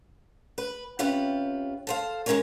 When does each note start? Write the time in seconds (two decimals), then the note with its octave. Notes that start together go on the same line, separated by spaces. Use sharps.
0.58 B4
0.99 C3 C#4 F4 G4 B4
1.87 A4 C5 F5
2.26 D#3 G#3 C#4 G#4 A#4 C#5